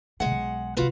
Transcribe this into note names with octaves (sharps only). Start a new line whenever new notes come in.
B2 D3 G#3 F#5
B1
C3 G#3 F4 F#4 B4